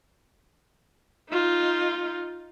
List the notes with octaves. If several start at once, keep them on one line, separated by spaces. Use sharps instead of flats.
D#4 F4